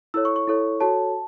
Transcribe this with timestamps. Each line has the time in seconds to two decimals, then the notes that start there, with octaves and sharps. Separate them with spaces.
0.14 E4 A4 C#5 E6
0.25 C#6
0.36 C#6
0.48 E4 A4 C#5
0.80 F#4 A4 C#5 A5